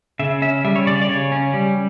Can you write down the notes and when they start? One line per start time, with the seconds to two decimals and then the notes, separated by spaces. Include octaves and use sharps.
0.19 C#3 E5
0.42 C#4 E5
0.65 G3 E5
0.76 C#5
0.87 C#3 D5
1.02 D5
1.09 C#3 C#5
1.32 C#4
1.53 G3